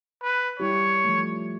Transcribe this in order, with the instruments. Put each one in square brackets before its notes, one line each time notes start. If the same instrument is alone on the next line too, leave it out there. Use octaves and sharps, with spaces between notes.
[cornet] B4
[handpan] G3 E4 G4 [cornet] C#5
[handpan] F3 A3